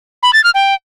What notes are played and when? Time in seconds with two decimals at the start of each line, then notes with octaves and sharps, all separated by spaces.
0.23 B5
0.33 A6
0.44 F6
0.54 G5